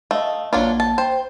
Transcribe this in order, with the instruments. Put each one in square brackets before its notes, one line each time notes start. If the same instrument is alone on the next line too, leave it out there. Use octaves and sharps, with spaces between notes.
[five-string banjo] A3 [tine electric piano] D#5 F5
[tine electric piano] A#1 A#3 [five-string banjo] F#3 D4 F4
[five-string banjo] A5
[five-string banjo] C5 [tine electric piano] G5